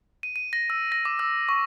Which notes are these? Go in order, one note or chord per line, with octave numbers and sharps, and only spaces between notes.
D#7
D#7
A#6
E6
A#6
D6
E6
C#6